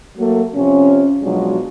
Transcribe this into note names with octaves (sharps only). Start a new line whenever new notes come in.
F#3 A3 A#3
C3 F3 C#4
B2 F3 F#3 G#3 D4